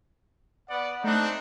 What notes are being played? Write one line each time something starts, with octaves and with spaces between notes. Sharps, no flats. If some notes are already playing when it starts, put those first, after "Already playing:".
B3 D5 F#5
A3 C4 D4 D#4 F#6